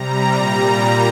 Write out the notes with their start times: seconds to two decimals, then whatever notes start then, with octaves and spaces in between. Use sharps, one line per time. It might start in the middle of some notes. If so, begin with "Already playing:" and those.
Already playing: C3 G3 A#5
0.33 A#2 G3 A#5